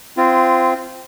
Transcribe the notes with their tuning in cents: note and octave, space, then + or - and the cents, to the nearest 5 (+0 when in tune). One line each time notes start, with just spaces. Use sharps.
C4 -10 F4 -25